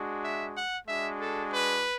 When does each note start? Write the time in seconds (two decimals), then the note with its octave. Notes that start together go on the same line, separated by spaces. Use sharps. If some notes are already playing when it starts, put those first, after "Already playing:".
Already playing: G#3 D4 F#4
0.23 E5
0.56 F#5
0.87 G#3 D4 F#4 E5
1.20 A4
1.52 B4